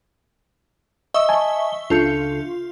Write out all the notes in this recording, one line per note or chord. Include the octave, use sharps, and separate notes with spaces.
D#5 E5 C#6 D#6 E6 G7
G#5 A5
C#2 C#3 D4 F4 A4 G6 C#7